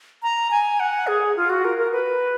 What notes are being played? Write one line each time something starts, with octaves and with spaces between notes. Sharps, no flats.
A#5
G#5
F#5
G#4
F4
F#4
A#4
A#4
B4